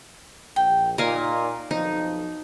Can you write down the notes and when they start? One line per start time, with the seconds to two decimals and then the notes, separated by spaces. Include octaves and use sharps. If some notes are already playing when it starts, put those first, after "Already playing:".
0.56 A#1 G5
0.98 A#2 D#4 A#4 D#5 F5 G#5
1.71 B1 F2 F3 D#4